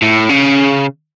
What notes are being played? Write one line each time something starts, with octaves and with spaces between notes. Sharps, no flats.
A2
C#3